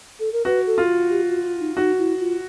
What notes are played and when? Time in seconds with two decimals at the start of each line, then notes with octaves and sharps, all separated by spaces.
0.20 A4
0.33 A#4
0.45 F#4 B4
0.67 A4
0.78 F4
1.10 G4
1.27 F#4
1.44 F4
1.60 D#4
1.76 D#4 F#4
1.98 E4
2.20 F4